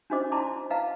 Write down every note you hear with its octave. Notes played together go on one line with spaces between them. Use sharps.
C#4 D4 F#4 C5 D#5 D6
E4 D5 A5 A#5 C6 D6
B4 D#5 F5 F#5 A5 A#5